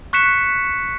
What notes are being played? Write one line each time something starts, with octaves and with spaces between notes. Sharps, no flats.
C#6 F#6 B6 C#7 E7